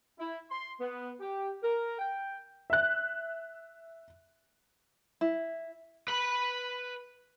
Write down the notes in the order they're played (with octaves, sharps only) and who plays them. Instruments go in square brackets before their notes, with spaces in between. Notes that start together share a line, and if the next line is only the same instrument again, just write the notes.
[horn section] E4
C6
B3
G4
A#4
G5
[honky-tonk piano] E5 F#6
[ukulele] E4
[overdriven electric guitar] B4 B5